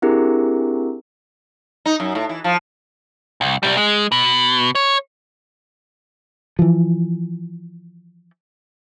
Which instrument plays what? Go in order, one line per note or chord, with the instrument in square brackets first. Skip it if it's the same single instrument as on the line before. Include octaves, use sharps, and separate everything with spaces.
[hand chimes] C4 D4 E4 G4 G#4 A#4
[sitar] D#4
F#2
A2
E3
F3
[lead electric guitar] C2
C2 G3
G#3
B2
C#5
[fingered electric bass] E3 F3